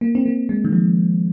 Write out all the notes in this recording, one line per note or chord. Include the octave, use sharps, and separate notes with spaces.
A#3
C4
A#3
G#3
D#3
F3